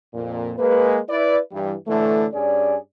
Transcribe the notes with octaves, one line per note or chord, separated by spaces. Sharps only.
F2 A#2
G#3 A#3 B4
E4 B4 D5
G2 E3 G3
A2 D3 E3 A3
G2 C#4 G#4 D5